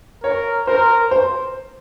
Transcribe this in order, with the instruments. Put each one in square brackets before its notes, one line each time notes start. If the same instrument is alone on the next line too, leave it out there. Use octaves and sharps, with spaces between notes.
[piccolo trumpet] A#4 [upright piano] C#5
[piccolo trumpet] A#4 [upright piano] C5
[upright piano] C5